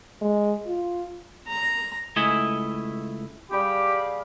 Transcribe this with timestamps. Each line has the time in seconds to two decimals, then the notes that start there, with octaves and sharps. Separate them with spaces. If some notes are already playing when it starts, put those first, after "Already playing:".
0.21 G#3
0.67 F4
1.48 A#5
2.16 C#2 A3 E4 D#5 E5 G#5
3.51 G3 G4 G#4 F5 B5 D6